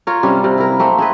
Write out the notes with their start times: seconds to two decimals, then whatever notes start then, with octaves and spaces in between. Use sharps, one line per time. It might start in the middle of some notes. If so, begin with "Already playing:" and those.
0.07 F4 A#4 C#5
0.23 C3 G3 C#4
0.44 C3
0.58 E4 A#4
0.79 A3 A#3 C4
0.98 C4 G#4 B4